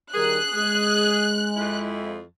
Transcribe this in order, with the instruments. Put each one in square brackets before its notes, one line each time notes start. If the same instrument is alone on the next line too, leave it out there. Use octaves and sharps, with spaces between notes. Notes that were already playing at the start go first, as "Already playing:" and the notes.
[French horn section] D#3 G3 A#4 [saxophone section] G#4 [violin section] F#6
[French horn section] G#3 [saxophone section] G#4
[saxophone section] F2 E4